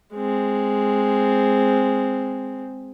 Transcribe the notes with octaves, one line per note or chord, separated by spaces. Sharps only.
G#3 C4